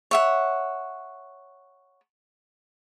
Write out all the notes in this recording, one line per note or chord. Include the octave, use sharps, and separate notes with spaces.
C#5 E5 F#5